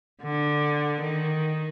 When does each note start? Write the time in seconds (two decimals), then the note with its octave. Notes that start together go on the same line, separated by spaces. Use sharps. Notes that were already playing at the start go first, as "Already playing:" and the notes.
0.22 D3
1.01 D#3